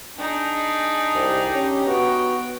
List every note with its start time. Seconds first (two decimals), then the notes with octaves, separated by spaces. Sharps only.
0.18 D4 D#4 G#4
1.15 C2 G4
1.54 C#4
1.86 B3 F#4 G5